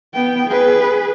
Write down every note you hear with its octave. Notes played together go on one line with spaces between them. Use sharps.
B3 G5
G#4 B4